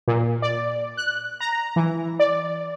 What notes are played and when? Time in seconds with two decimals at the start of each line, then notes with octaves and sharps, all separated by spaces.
0.08 A#2
0.42 D5
0.97 F#6
1.40 A#5
1.76 E3
2.20 D5